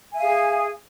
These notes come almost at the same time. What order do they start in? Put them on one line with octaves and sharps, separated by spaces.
G#5 E5 F5 G#4